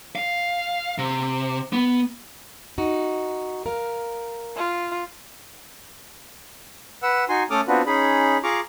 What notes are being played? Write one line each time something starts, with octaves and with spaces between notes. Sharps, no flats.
F5
C3
B3
D#4 F#4
A#4 F5
F4
B4 F#5 E6
D#4 F#4 G#5 C6
A3 C#4 A4 D6 D#6 F6
B3 C4 D4 F4 F#4 B4
C#4 D#4 G#4 B5
F4 G#4 F5 A#5 C#6 D6